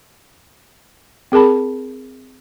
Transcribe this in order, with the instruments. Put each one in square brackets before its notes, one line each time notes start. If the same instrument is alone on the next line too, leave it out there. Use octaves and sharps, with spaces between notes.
[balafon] C4 G#4 A#4 A5 B5